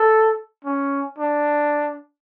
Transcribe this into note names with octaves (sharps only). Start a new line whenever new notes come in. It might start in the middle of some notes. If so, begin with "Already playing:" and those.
Already playing: A4
C#4
D4